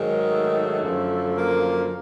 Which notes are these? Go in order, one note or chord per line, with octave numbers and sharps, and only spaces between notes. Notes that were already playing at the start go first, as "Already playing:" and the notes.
Already playing: G#2 D#3 F#3
A3
F#2 D3 F3
A#3